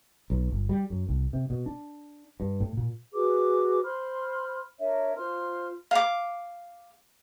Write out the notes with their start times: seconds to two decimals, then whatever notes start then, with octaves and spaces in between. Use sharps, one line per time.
0.30 B1
0.51 G1
0.69 G3
0.90 F#2
1.09 C2
1.33 C3
1.50 B2
1.66 D4
2.40 G2
2.60 A2
2.77 A#2
3.13 F#4 G#4 B4 D6
3.83 C5 B5 C6 F6
4.80 D4 A#4 C#5 E5
5.16 F4 C5 C6 F6
5.91 F5 D6